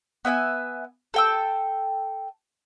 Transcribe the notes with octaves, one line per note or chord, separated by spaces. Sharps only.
B3 E5 G5 G#5
A4 G5 E6